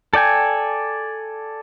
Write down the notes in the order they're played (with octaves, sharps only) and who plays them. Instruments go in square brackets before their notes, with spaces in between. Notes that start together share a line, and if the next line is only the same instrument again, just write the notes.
[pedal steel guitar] A4 D5 G5 G#5